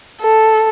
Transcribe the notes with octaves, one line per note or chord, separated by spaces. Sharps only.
A4